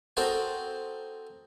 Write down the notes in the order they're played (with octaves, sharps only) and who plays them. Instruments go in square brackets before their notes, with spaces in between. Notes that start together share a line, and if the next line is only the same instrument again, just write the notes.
[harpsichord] C4 D#4 F#4 A4 A#4 C5